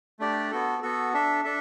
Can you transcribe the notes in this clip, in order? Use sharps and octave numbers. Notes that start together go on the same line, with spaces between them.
A3 D4 G4 D5
B3 F#4 A4
B3 F#4 A4
D4 A4 E5
D4 A4 E5